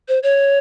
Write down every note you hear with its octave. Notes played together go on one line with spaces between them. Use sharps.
C5
C#5